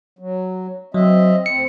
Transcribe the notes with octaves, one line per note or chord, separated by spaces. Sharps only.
F#3
F#3 C4 D#5 E5
D2 C4 C#7